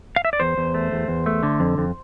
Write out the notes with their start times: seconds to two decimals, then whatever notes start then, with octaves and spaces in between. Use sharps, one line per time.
0.16 F5
0.25 E5
0.33 D5
0.40 E2 C5
0.58 E2
0.74 A3
0.92 E2
1.08 E2
1.26 A3
1.43 D3
1.60 F2
1.78 F2